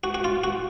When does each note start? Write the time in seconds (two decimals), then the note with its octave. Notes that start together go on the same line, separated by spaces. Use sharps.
0.04 F#4
0.14 F#4
0.24 F4
0.44 F#4